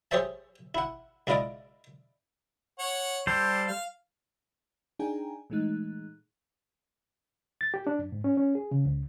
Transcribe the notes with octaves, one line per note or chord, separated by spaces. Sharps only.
G4 G#4 C5 C#5 E5 A5
E4 F#5
C#2 E4 F4 D5 D#5 D6
C#5 F#5
G3 G4 A4 C5
F5
D4 D#4 G#4 G5 G#5 A#5
A#2 E3 G#3 A3 D#4 F#6
A6
G4
D4
F#2
G#2
C#4
C#4
G#4
C#3
C#2